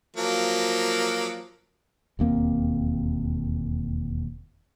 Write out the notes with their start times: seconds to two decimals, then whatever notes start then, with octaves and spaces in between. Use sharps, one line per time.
0.17 F3 F#3 A#3
2.19 E1 D#2 A#3 C4